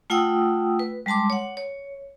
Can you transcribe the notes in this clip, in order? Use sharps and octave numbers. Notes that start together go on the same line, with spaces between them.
A3 F4 F#5 G5 D#6 E6
B4
G3 G#3 A5 C6 D6
C#5 F#5
C#5